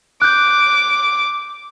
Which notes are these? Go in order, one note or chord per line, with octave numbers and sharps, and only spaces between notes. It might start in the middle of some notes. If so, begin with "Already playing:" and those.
D6 F#6 G6